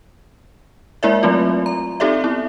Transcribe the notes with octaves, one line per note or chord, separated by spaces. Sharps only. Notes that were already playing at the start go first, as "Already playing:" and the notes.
G#3 A#3 E4 A#4 D5 E5
F#3 A3 C4 F4
A#5
C4 D#4 G4 A4 D5 E5
B3 E4